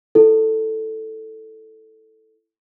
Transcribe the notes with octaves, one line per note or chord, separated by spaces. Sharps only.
E4 A4